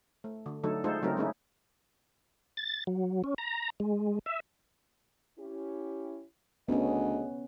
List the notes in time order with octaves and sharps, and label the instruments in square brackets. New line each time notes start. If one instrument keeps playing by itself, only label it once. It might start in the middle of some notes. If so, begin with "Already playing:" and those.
[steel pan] A3
D3
D3 F#3 A3 D#4 A4
G#3 A3 D#4 F4 A4 C5
C#3 F#3 A3 C4 D#4 A#4
G#3 A#3 C#4 D#4 E4
[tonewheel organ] A6
F#3
C#4
A#5
G#3
E5
[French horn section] C#4 E4 G4
[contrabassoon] D2 [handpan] B3 C#4 [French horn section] G#4 D#5